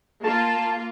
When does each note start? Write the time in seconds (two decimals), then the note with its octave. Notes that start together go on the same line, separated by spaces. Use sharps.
0.24 A#3 F4 A5